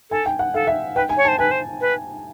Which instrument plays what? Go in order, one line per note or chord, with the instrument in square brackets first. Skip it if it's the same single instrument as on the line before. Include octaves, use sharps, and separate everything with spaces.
[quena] A4 [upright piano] G#5
[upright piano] G5
F#5
[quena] A4 [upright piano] F5
[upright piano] E5
[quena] B4 [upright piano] G5
[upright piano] G#5
[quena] C#5
[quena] C5 [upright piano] A5
[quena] B4 [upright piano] G#5
[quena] C5
B4